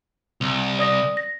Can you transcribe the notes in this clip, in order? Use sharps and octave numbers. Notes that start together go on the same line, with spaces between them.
C2 F7
D5 D#6 A#6
A#6